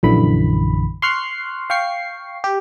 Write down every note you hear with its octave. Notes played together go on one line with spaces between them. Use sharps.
A#1 F#2 D3 E3 B5
C6 C#6 F6 F#6 C7
F5 G5 C#6 C7
G4